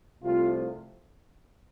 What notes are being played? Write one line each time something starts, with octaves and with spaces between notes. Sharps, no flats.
C2 C3 F3 A3 F4